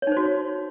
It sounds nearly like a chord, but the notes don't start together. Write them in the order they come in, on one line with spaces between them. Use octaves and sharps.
C#5 D#4 C5 F#4